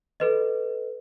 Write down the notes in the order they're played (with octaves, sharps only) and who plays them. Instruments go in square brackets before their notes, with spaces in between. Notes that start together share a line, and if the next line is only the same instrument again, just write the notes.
[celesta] A4 B4 D#5